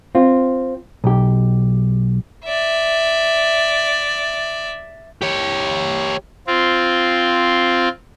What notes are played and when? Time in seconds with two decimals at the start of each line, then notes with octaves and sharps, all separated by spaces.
0.15 C4 F4
1.04 B1 G4
2.45 D5 E5
5.22 G4 C#5
6.47 C4 F4